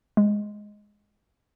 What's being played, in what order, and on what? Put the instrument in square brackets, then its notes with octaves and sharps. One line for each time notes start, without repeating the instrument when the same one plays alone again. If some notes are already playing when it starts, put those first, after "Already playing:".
[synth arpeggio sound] G#3